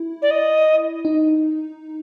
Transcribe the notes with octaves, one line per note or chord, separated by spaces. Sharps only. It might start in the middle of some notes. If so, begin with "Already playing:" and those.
Already playing: E4
D5
D#5
D#4